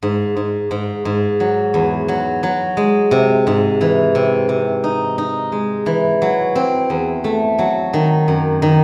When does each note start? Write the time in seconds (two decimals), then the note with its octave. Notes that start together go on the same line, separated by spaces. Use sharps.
0.03 G#2
0.37 G#2
0.71 G#2
1.05 G#2
1.40 F#3
1.74 E2
2.08 F#3
2.43 F#3
2.77 G#3
3.11 C3
3.47 G#2
3.81 E3
4.15 C3
4.49 C3
4.84 D#4
5.18 D#4
5.52 G#3
5.86 E3
6.22 F#3
6.55 C4
6.90 E2
7.24 A3
7.59 F#3
7.93 D#3
8.28 F#2
8.62 D#3